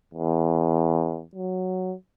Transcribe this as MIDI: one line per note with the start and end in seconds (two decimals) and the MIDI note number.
0.14 1.24 40
1.35 1.94 54